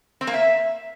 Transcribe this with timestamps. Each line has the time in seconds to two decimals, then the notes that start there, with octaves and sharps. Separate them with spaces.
0.21 C4
0.27 A#3
0.34 E5